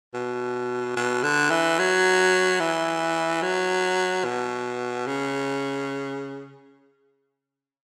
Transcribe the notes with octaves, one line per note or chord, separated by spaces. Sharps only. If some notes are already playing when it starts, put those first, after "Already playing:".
B2
B2
D3
E3
F#3
E3
F#3
B2
C#3